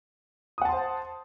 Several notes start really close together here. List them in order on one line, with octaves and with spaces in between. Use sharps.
D#6 F#5 A5 C6 C5